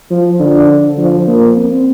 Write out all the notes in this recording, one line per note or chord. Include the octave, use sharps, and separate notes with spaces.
F3
D3
F3
A#3
C4